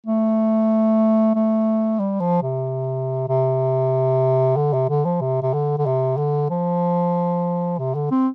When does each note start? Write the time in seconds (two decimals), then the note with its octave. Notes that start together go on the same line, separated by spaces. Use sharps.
0.06 A3
1.35 A3
1.99 G3
2.20 F3
2.42 C3
3.28 C3
4.56 D3
4.73 C3
4.89 D3
5.05 F3
5.21 C3
5.42 C3
5.54 D3
5.78 D3
5.86 C3
6.17 D3
6.50 F3
7.78 C3
7.95 D3
8.11 C4